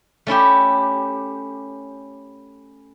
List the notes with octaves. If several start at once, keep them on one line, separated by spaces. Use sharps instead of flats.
A3 C#4 E4 G4